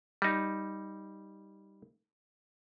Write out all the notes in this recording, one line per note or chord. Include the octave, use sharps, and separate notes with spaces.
G3 D#4